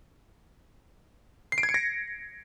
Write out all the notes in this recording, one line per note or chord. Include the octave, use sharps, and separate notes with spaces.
C7
D7
G#6
C#7
A#6